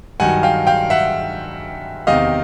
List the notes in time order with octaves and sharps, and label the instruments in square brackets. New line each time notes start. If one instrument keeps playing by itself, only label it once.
[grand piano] G2 D#3 F#3 F#5 G#5
F5 G5
F5 G5
E5 F#5
E2 C3 D#3 D#5 F5